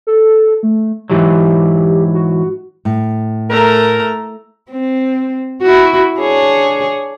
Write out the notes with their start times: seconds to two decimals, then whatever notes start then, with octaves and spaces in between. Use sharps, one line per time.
0.07 A4
0.63 A3
1.10 G#2 E3 F#3 G4
2.14 F#4
2.85 A2
3.50 A3 A#4 A#5
4.71 C4
5.62 E4 F#4
6.19 D4 G#4 C#5